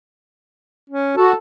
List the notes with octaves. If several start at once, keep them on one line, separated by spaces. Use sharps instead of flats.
C#4
F#4 A4